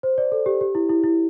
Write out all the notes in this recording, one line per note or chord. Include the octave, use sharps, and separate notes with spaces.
C5
D5
A4
G4
G4
E4
E4
E4